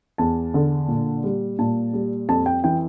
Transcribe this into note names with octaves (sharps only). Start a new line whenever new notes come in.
E2 A5
D3
A#2
G3
A#2 A5
G3
F2 A5
G5
E3 G5